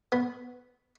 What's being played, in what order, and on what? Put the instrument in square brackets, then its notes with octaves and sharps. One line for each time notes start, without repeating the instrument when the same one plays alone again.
[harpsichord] B3